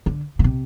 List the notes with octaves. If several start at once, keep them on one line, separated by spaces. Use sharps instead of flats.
D3
C#3
C3